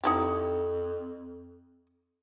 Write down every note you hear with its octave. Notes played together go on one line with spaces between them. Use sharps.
F2 D#4 E4 G4